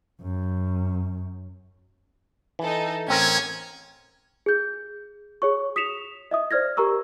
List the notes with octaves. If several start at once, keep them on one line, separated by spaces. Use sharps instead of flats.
F#2
E3 D#4 A4
A1 C4 C#4 A#4 G#6
G#4 G6
G#4 C#5 C#6
D#6 B6 C#7 E7 F7
D#5 E5 D#6
C5 D5 F6 G#6 A#6
G4 A#4 A#5 C#6 E6